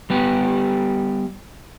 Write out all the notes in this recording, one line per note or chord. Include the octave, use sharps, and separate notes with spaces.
G3 B3 G4